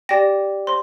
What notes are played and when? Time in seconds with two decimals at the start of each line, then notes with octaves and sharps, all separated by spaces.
0.09 G4 D5 G5 A#6
0.67 C5 C6